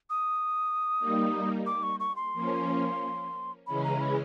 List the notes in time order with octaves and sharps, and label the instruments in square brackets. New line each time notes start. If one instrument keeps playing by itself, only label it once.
[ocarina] D#6
[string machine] G3 A#3 D#4
[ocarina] D6
C#6
C#6
C6
[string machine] F3 A#3 C#4
[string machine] C#3 E3 G#3 C#4 [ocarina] B5
[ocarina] A#5
B5